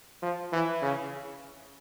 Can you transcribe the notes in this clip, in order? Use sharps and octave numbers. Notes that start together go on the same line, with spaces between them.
F3
E3
C#3